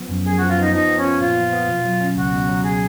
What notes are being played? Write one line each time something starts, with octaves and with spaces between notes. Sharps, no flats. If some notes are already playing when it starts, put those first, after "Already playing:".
Already playing: F3 B3
F#2
F#2 G#4
F3 F#4
F4
B3 D#4
F3 D#4
B3
C#4
F4
A#2 F4
F3
B3
B2
F#3
C#4
C#2 F#4
B2
F#3
G#4